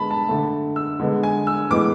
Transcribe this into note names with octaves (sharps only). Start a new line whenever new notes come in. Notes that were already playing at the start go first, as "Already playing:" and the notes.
Already playing: D3 G#3 B3 A5 B5
A5
D3 A3
E6
D3 G#3 B3
G#5
E6
A2 E3 G#3 B3 D6